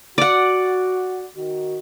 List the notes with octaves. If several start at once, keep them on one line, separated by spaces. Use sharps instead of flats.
F#4 D5 F#5
D#3 F#4